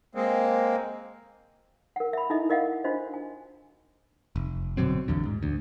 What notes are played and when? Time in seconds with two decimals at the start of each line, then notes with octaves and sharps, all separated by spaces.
0.15 G#3 A#3 C4
1.96 A#4 F#5
2.13 E5 B5
2.30 D#4 E4 A4 D#5 E5
2.49 A#4 D#5 F5 F#5
2.84 D4 F4 F#4 C5 D#5
3.14 G#5
4.36 F1
4.77 B2 D3 F#3 C4
5.08 A1 E2 D3
5.25 G#2
5.43 D2